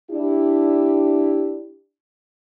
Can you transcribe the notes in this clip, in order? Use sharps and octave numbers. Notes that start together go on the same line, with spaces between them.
D4 E4 G4